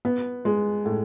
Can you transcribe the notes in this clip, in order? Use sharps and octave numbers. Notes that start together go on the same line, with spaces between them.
B3
G#3
A2